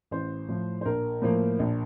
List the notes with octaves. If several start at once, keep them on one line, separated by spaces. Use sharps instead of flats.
A1 C5
A2 F3
C5
A#1 A#4
A2 F3 A#3
A#1